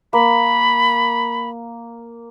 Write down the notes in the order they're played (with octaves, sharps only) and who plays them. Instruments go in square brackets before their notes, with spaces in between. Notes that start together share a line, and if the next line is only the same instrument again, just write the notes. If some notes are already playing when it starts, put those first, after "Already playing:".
[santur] A#3 [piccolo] B5